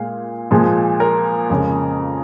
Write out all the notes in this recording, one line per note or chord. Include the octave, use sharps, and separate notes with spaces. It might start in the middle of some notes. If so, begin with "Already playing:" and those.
Already playing: A#2 G#3 F5
A#2 F3 G#3
A#4
F2 C#3 G#3